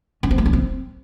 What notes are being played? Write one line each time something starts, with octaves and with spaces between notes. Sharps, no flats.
C#4
C4
A3
C#4
C4